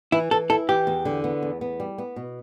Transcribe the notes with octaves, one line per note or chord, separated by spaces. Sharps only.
E3 E4
E3 A4
E4 A4
E3 G4
E2
D3
B3
E2
B3
G3
B3
B2